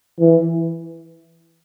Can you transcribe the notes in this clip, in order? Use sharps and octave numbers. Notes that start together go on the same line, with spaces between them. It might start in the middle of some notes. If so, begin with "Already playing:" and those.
E3